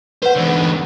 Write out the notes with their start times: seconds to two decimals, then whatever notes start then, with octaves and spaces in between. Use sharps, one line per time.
0.22 B4 C5 F#5
0.35 E2 D3